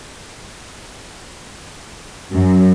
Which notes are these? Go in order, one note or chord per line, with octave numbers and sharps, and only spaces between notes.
F#2